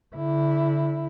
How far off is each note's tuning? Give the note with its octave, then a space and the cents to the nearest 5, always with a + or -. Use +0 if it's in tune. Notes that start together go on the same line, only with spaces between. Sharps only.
D3 -30 E4 +0